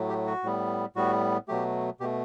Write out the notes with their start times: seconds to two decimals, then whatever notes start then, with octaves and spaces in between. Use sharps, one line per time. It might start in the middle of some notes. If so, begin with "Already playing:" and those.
Already playing: A2 F#3 A3
0.09 G4
0.27 F#4
0.43 A2 G3 B3
0.96 A2 G3 B3 F#4
1.48 B2 F#3 A3 G4
2.00 B2 G4
2.04 A3